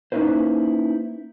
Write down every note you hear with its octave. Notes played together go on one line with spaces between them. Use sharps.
A#3 C#4 D#4 E4 B4 C5